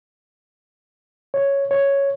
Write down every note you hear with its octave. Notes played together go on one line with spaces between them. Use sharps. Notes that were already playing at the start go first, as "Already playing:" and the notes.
C#5
C#5